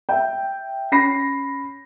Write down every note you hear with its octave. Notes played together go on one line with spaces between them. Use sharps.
E5 G5
C#4 B5 A#6 C7